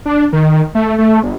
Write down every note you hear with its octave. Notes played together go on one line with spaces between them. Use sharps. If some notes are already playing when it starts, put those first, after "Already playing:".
D4
D#3
A3
A3
G1